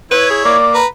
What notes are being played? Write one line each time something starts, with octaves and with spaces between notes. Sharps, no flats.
E4 B4 C#5
G#4
A#3 D5
B4 A#5